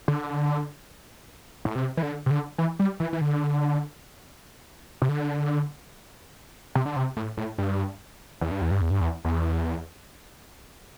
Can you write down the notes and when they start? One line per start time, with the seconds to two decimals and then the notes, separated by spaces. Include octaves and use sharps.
0.08 D3
1.65 A2
1.75 C3
1.97 E3
2.03 D3
2.26 C3
2.31 D3
2.58 E3
2.79 G3
3.00 E3
3.13 E3
3.21 D3
5.02 C3
5.09 D3
6.75 C3
6.86 D3
6.96 C3
7.17 A2
7.38 A2
7.58 G2
8.41 E2
8.51 G2
8.61 E2
8.71 G2
8.81 E2
8.91 G2
9.01 E2
9.25 E2